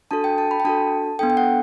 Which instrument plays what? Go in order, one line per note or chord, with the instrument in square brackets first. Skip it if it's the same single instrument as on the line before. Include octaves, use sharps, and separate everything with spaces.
[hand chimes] D4 F#4 A4 A5
G5
A5
B5
G5
D4 F#4 A4 A5
B3 D4 A4 G5
G5
F#5